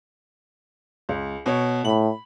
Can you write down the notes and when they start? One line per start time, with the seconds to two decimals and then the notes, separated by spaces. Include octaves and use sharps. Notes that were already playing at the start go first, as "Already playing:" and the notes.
1.09 C#2
1.46 B2 C#5
1.85 A2 B5 F#7